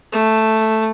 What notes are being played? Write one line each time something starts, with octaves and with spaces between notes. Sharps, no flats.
A3